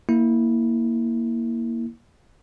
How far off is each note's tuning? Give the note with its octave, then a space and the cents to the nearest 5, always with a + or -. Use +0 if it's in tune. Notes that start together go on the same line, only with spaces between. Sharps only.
A#3 +0 E4 -15